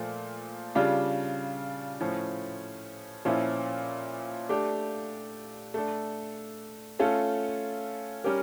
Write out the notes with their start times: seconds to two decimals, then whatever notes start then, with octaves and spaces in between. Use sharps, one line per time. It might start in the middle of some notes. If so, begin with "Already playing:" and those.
Already playing: A#2 F3 A3
0.75 C#3 G3 D4 F4
2.00 A2 F3 C#4
3.25 A#2 F3 C#4 E4
4.49 A3 D4 G4
5.74 A3 D4 A4
6.99 A3 C#4 F4 A4
8.24 G3 C#4 G4 A#4